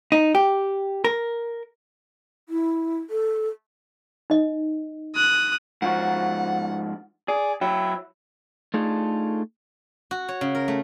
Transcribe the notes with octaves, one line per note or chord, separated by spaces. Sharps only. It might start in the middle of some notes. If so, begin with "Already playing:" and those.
D#4
G4
A#4
E4
A4
D#4 D#5
D#6 F#6
G#2 F3 F#4 F#5
G#4 D5
F#3 E4 G5
A3 D4 D#4 F4 G#4 A4
F#4
C#5
C#3
A#4
A3